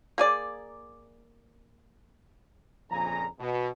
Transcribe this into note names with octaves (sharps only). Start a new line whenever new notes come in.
A#3 G#4 D5
A#1 F2 A#2 C#3 G#5 A#5
B2